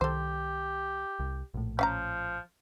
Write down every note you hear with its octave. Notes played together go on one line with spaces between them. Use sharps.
C2 D#3 G4 A4 C5
C2
A#1 A2
F3 C#4 F5 A#5